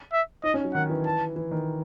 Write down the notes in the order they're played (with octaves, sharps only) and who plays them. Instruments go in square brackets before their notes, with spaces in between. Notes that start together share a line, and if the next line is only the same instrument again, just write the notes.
[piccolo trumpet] E5
[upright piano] D#4 [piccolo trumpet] D#5
[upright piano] C#4
F#3
[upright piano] D#3 [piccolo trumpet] F#5
[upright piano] E3
[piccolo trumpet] A5
[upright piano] E3
D#3